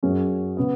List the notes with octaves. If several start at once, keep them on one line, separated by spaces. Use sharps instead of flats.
F#2 F#3 C#4 G#4
C#3 B3